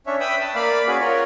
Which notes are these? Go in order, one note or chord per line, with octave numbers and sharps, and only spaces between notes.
C#4 D4 C#5 E5
B4 E5 G5 B5 D#6 E6
A5
A#3 D5 F5 B5
C#4 F#4 G#4 B4
F4 A#4 C#5